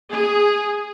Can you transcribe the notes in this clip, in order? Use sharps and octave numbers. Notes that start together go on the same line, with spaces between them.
G#4